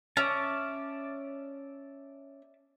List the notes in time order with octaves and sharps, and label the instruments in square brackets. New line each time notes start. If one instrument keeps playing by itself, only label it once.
[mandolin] C#4 [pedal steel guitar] D5 E5 A5